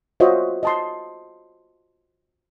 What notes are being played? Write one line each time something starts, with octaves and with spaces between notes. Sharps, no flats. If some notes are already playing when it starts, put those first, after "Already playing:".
F4 F#4 C5 C#5 D#5 E5
D#5 A5 C6